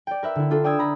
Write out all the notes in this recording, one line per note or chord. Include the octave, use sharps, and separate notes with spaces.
D5 G5
A#4 B4 E5
D3 E4
D4 F4 A4
D5 G5 D#6 E6 G#6
A#5 B5